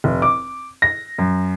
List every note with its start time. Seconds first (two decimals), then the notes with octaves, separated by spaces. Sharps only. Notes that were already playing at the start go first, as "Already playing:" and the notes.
0.04 F1
0.22 D6
0.82 A#6
1.18 F#2